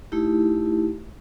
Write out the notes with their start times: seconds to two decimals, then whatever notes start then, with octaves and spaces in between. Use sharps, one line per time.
0.12 A3 D#4 E4 G4